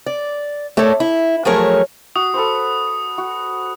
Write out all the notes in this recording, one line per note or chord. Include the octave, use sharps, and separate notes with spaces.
D5
A3 A4 A#4 C#5 D5
E4
F3 F#3 A3 G#4 A#4 C#5
F#4 D#6
A4 B4 C5
F#4